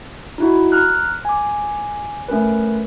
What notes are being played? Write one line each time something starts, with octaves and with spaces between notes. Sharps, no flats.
D#4 E4 F#4
A#5 F6 F#6
G#5 D6
A3 C#4 A#4 B4